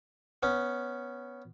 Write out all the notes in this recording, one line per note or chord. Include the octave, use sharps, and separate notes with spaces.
B3 C#4